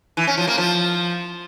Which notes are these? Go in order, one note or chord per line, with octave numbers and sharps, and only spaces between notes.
E3
C#4
F3
A#3
F3